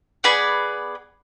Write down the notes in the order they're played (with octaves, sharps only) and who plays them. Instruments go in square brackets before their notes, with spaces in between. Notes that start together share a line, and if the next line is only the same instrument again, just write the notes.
[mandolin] B3 G#4 D5 B5